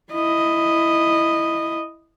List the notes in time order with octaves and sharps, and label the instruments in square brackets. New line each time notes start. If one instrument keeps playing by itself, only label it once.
[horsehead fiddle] E4 D#5